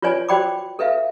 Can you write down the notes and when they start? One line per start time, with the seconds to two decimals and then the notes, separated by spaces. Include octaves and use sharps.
0.02 F4 B4 C#5 D5 G#5
0.29 F#4 C5 D5 G5 B5 D6
0.79 A4 B4 E5 F5